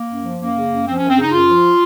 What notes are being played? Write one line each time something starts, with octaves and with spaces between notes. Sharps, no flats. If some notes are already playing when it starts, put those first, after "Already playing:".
Already playing: A#3
F#2
F3
F#2 A#3
C#3
F#2
F3 C4
F#2 C#4
C4
C#3 D#4
F#2 F4
F3